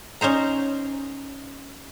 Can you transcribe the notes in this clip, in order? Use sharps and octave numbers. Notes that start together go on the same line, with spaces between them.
C#4 D#4 C5 A#5